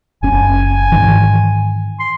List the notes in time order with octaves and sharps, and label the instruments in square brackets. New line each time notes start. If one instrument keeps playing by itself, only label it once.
[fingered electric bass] F#1 C#4 [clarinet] G#5
[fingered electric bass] G#2 D#3 E3
[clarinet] C6